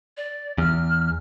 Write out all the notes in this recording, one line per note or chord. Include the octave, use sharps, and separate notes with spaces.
D5
E2 F6